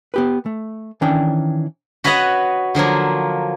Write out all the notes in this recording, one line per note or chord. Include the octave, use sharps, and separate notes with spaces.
B3 G4 B4
A3
D#3 E3 C#4 D4 D5 G5
F#4 B4 C#5 D#5 F#5
D3 F3 F#3 A#3